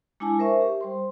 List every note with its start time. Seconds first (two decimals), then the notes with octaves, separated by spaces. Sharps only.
0.20 G#3 D4 E4 G#5 A5 D6
0.39 A#4 C5 E5 C#6
0.61 G4
0.81 G3 C5 C6